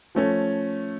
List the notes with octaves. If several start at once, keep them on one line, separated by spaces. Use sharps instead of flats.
F3 A3 C#4